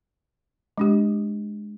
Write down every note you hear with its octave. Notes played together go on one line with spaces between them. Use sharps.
G#3 D4 G4